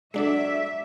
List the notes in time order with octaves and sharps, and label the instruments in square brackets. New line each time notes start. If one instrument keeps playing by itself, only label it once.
[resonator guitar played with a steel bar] F#3 D5 [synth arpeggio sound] G#3 D4 A4 [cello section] E5